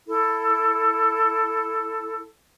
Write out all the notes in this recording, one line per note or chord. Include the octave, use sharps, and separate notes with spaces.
E4 A4